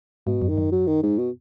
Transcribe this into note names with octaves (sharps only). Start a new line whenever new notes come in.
G#2 B2
F#2
D#3
F#2
F#3
D#3
G#2
B2